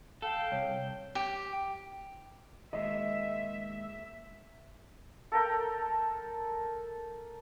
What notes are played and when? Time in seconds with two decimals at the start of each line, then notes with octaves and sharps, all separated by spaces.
0.22 A4 F5 G5
0.52 C2 C#5
1.15 G4
2.73 D#3 G#3 A#3 D#5 E5
5.32 A4 A#4 G5